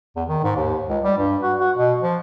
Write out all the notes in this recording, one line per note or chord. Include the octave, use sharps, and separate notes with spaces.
E2
D#3
G#2
D#2
C#2
G3
G2
F#4
F#4
B2
F3